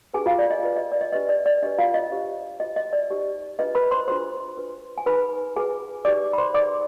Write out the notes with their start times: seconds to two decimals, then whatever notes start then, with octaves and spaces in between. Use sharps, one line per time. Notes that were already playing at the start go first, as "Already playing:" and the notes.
0.14 D4 G4 G#4 B4 G#5
0.26 F4 F5
0.39 D5
0.50 D#5
0.63 F4 B4
0.76 D#5
0.92 D5
1.01 D#5
1.12 D4 G4 B4 D#5
1.29 D5
1.46 D5
1.62 D4 G4 B4 D#5
1.78 F4 F5
1.94 D#5
2.11 D4 G4 C5
2.60 F4 C5 D#5
2.76 D#5
2.93 D5
3.10 D#4 G4 C5
3.59 D4 F4 G#4 B4 D#5
3.75 B4 B5
3.91 C5 C6
4.08 D4 F4 G#4 C5 C6
4.57 D4 F4 B4
4.98 G#5
5.06 D#4 G#4 B4 C5 B5
5.55 F4 G#4 B4 G#5
6.05 D#4 G4 B4 D5 D6
6.33 B5
6.38 C5 C6
6.54 D#4 G#4 B4 D5 D6